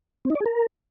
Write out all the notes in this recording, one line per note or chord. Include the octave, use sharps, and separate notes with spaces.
C4
D#4
D5
G#4
A#4